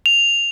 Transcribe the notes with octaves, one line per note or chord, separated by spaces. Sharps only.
F7